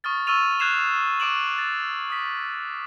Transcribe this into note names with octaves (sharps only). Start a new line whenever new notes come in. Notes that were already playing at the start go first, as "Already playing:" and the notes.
C#6 D#6 F6 A6
C#6 E6 F6 A6 D#7 F7
F6 F#6 G#6 C7 E7 F7
C#6 D6 D7 E7 F#7
A6
D#6 B6